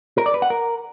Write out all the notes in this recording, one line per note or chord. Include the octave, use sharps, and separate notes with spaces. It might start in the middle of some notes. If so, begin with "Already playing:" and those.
A#4
D5
B4
F#5
A#4